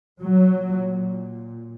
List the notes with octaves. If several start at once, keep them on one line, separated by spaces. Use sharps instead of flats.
A#2 F#3